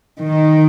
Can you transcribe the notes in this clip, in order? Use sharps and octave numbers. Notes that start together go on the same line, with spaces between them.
D#3